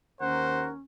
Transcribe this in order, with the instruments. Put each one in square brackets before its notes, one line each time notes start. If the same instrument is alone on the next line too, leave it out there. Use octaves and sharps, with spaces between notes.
[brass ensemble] D#2 A#4 [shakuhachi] C#4 [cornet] C5 [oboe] F#5